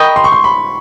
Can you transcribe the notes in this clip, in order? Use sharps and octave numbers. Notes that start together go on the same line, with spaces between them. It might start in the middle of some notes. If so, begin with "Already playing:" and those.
Already playing: A#4 D#5 G5 B5 C#6
C6
C#6
C6
B5